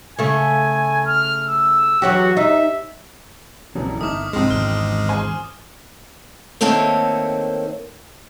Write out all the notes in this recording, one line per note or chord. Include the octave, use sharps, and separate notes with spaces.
C#3 A3 G#5
F6
E6
E2 F#3 F#4 G4
D#4 E5
F1 A#1 E3 F#3 C#4
G1 A3 D#4 D6 D#6 F6
C2 G#2 F3 G#3 C4
G#1 E2 D3 F6
C5 G#5
D#3 A3 A#3 C4 C#5